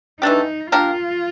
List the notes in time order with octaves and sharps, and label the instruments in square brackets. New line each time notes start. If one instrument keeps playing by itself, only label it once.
[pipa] E3 A3 D4 G4 [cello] D#4
[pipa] A#3 D4 G4 A#4 [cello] F4